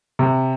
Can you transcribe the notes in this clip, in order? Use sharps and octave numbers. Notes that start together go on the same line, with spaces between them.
C3